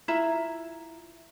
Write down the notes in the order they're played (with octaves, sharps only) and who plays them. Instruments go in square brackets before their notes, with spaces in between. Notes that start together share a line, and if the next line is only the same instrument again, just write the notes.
[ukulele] E4 F4 E5 A#5